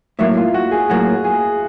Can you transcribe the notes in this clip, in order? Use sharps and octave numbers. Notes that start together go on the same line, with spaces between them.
A2 F#3 A#3 E4
F4
F#4
G#4
A2 F#3 A#3 F#4
G#4